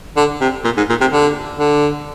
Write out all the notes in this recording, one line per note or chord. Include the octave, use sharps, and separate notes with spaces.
D3
C3
A#2
G#2
A#2
C3
D3
D3